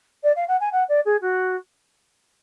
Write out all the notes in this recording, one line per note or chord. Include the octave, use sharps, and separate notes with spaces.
D5
F5
F#5
G#5
F#5
D5
G#4
F#4